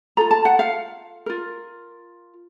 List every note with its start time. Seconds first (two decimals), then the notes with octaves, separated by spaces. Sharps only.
0.17 F4 A4 A#5
0.31 A5
0.45 F#5
0.59 F5
1.26 F4 A#4